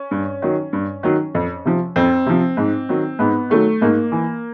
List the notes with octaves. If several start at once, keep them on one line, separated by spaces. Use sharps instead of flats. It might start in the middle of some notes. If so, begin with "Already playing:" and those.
Already playing: C#4
G2
D#3 F#3
G2
D#3 F#3
F2
C3 F3
F2 C4
C3 F3
G#2
D#3 F#3
G#2 B3
D#3 F#3 A3
G#2 A#3
E3